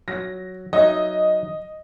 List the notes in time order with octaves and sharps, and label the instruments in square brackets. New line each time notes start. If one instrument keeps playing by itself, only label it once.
[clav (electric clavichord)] F#3 [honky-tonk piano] A#6
[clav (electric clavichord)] F#3 D#4 E5 [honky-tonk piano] D#5